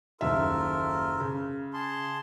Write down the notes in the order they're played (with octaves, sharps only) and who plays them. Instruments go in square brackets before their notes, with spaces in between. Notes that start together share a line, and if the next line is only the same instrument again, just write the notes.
[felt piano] F#1 D#2 E5 [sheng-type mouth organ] F4 A4 A#4
[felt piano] C#3
[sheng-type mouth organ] G#4 A5 C6